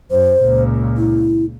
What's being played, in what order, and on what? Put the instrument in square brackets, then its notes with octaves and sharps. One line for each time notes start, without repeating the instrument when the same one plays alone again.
[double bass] F#2 [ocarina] C5
[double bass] C#2 A#2
[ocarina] E4